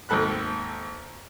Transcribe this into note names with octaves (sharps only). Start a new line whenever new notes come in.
G#1 D#2 G#2 A4 B5 F#6